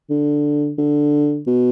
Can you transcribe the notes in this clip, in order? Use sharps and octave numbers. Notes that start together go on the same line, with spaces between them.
D3
D3
B2